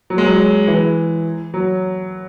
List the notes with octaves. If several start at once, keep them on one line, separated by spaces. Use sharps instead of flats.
F#3
G#3
F#3
E3
F#3